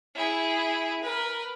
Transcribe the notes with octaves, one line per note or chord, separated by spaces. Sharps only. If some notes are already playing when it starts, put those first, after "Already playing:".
E4 G#4
A#4 B4